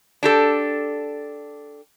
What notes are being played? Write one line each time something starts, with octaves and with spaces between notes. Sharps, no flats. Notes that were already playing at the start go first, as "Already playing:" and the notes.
D4 G4 A4